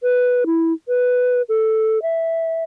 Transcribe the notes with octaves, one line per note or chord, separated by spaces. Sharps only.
B4
E4
B4
A4
E5